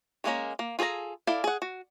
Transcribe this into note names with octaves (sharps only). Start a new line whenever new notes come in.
D#3 G#3 A#3 C#4 A#4
A#3
F4 G#4 A4 C5 A#5
E4 A4 D5 F5
G#4 F#5
F#4